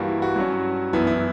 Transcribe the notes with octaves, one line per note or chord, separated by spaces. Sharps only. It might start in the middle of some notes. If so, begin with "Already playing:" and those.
Already playing: G2 E3 G3 A#3 F#4
E4
F#4
G2 F#3 C#4
F#2 E3 B3 E4
E4